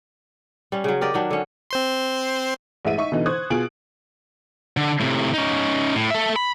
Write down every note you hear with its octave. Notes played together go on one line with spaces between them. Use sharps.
G3 C#4
C#3 F#3
G4 A#4 D5 D#5
D#3 F#3 D4
D3 C#4
C4 C5 C6
A1 G#3 E5 D#7
D#4 E5 C#6
B2 D3 E3 D#4
C5 C#6 D#6 F#6 G#6
B2 F4 G#4 G#5 D7 F#7
D3
A2 C3
C#4 D#4
A2
A4 E5
B5